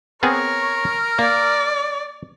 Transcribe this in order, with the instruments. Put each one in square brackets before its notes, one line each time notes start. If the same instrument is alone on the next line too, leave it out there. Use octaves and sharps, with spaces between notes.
[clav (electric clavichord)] B3 C4 G#4 [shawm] A#4 [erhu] C#5
[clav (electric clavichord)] A#3 [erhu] D5